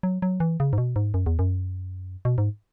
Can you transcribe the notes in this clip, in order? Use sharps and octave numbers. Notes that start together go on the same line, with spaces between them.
F#3
F#3
E3
C#3
G#2
B2
G#2
F#2
E2
F#2
B2
G#2